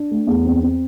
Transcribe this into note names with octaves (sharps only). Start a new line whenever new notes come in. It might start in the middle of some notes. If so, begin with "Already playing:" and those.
Already playing: D4
A3
E2
C4
C4